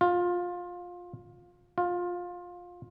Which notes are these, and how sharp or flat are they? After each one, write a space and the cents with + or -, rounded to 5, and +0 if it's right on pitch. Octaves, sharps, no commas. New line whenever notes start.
F4 +20
F4 +20